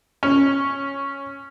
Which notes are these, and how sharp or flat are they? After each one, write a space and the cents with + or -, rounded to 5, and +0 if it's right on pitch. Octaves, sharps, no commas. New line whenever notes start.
C#4 -5